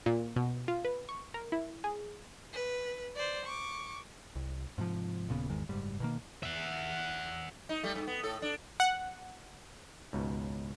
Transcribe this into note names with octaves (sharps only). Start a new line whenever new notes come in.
A#2
B2
F4
B4
C#6
A#4
E4
G#4
B4
C5 D5
C#6 D6
C2
G#2 C3 D#3 F3
D#1 A#2 C#3 B3
G#1 E2 D#3 G#3
F#1 G#2 G3
B2 D#3 A#3
E5 F#5
D#4
G3 A3
G2
B3
A2 A4
D4
F#5
C#2 G#2 B2